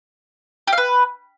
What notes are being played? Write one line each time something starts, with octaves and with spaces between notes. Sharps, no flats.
G4
F5
B4